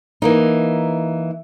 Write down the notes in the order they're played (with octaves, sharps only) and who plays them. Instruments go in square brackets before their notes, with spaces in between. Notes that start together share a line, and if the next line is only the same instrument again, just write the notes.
[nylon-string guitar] E3 A#3 D#4